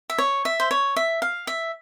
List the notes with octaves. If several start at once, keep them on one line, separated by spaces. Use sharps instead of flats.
E5
C#5
E5
C5
C#5
E5
F5
E5